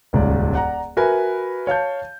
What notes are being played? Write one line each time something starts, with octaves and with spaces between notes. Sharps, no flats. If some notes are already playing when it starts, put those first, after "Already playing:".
D#1 C#2 G#2 D5
D5 F#5 A#5
F#4 A#4 B4 E5 G#5
C#5 F5 A5 G6